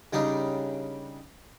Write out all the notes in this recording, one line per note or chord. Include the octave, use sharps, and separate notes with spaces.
C#3 G3 D4 D#4